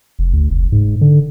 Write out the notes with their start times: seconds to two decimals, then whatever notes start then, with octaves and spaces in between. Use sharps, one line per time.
0.19 F1
0.33 D2
0.50 F1
0.72 G#2
1.01 D3